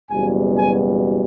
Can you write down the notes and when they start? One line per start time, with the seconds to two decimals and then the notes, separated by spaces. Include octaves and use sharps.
0.11 F#1 E2 B2 G3 G#5
0.58 G#5